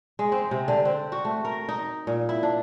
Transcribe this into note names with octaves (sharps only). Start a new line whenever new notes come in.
G#3
C4
C3
D3
C4
F#4
A3
A#4
D#4
A#2
E4
D4